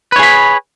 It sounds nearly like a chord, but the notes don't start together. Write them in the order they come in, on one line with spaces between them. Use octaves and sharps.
B4 C#5 G#4 B5